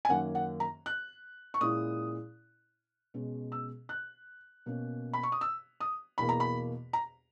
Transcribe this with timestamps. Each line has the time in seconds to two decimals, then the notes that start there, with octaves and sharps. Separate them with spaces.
0.05 G#5
0.09 F#2 D#3 A#3 C#4 F#5
0.35 F#5
0.60 A#5
0.86 F#6
1.54 C#6
1.61 A#2 G#3 C#4 E4 D#6
3.14 B2 G#3 C#4
3.52 E6
3.89 F#6
4.66 B2 A#3 C#4
5.13 B5
5.23 C#6
5.32 D#6
5.41 E6
5.80 D#6
6.18 E2 B2 A#3 B5
6.29 A#5
6.40 B5
6.93 A#5